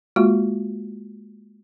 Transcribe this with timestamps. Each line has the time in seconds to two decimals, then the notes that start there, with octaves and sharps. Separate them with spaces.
0.16 G#3 A#3 F4 F#4